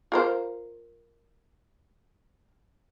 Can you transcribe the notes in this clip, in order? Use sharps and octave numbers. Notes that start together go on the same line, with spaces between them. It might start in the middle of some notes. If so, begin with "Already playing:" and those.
F4 A#4 C5